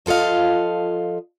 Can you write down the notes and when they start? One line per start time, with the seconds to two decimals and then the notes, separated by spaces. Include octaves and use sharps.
0.06 F3 F4 A4 D#5 F5